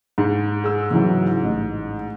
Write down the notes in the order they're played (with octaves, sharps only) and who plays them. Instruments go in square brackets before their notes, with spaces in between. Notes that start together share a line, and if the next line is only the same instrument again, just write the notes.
[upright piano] G#2
[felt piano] G#4 E6
C#3 E3 F#3
A1